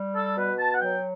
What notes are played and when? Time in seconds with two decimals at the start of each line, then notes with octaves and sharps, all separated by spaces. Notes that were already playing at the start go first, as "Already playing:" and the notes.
Already playing: G3
0.16 A4
0.37 B2 B4
0.59 A5
0.75 F#5
0.79 F#3 G5